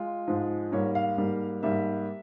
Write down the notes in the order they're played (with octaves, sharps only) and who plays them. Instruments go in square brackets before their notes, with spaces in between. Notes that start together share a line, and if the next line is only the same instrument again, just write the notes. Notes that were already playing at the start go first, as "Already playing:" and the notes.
Already playing: [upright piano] G#3 F4
G#2 F3 G#3
G#2 G3 A#3 C#5
F5
G#2 G3 A#3
G#2 G3 A#3 E5